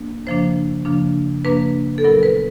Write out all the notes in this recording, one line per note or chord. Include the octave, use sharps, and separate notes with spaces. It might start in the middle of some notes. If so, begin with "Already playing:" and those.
Already playing: A#3 D4
F#2 C#3 F3 A#3 D4 C5
F#2 C#3 F3 A#3 D4
F#2 C#3 F3 A#3 D4 B4
A4
A#2 F#3 B3 E4 A#4
B4